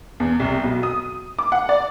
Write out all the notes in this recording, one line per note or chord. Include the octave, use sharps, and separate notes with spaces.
E2
C2
B1
D#6
D6
F#5
D5